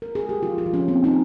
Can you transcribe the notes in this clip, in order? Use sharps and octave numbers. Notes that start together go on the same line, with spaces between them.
A#4
G#4
G4
F3 F4
F4
F3
C#4
A#3 C4
D#4